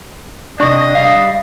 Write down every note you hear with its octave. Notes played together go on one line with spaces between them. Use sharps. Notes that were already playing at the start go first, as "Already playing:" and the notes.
C3 D4 D5 D#5 C#6
G3 F5